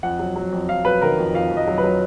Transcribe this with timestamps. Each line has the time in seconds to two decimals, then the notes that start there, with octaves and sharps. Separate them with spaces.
0.03 F2 F#5
0.19 F#3
0.36 F#3
0.52 F2
0.69 F2 F5
0.85 F#3 B4
1.02 D#3 A#4
1.18 F2
1.34 F2 F5
1.51 F2
1.57 D#5
1.67 F#3
1.78 B4
1.83 F#3